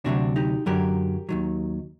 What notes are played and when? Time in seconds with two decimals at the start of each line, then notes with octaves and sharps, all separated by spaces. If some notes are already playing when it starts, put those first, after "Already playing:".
0.04 D2 C3 D#3 F#3 D4 F#4
0.36 D#4 G4
0.66 F#2 D3 F#3 G4 A#4
1.29 D#2 D#3 F#3